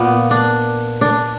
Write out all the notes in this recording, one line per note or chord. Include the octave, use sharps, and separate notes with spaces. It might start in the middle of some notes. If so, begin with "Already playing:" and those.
Already playing: A#2 A#3 B3
D4
D4